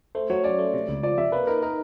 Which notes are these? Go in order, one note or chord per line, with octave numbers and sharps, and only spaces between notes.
A3 C5
F#3 C#5
C#4 D5
A3
C3
C#2
F3 D5
C3 E5
A#3 B4
D#4 A#4
D#4 A#4